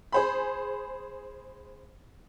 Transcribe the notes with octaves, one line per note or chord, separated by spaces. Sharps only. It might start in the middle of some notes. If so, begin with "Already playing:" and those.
G#4 C5 B5